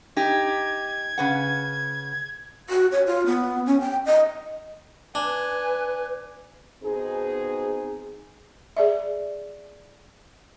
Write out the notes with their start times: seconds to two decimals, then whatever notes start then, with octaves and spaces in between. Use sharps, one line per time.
0.16 D#4 G4 G#6
1.18 C#3 B4 F#5
2.70 F#4
2.92 C#5
3.07 F4
3.26 B3
3.66 C#4
3.81 G5
4.06 D#5
5.15 D4 B4 G#5
6.84 B2 C4 D#4 G#4
8.77 G#4 D5 E5